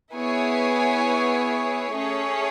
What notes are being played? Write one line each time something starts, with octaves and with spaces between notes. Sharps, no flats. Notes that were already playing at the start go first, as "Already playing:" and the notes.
B3 E4 G#4 C#5 G#5
A3 C#4 G#4 C#5